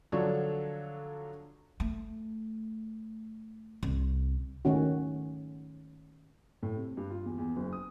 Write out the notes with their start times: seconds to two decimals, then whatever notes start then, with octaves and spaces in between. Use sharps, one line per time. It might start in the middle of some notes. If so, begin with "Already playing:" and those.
0.12 D3 F3 F#3 D4 A4 C#5
1.80 A3
3.83 C2
4.65 D#3 A3 C#4 F#4
6.63 A2
6.76 C3
6.97 G2
7.10 F4
7.26 E2
7.38 E2
7.56 F#1
7.73 D#6